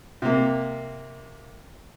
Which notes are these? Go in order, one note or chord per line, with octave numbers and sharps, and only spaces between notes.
C3 A#3